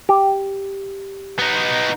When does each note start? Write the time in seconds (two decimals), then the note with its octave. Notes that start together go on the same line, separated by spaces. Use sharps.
0.09 G4
1.39 B3 D#4